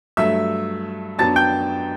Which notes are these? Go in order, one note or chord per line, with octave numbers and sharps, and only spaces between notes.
G2 F#3 A3 E5 E6
F#2 F#3 B3 D4 A5 A6
G5 G6